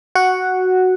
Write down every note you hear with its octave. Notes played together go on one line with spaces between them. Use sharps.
F#4 F#5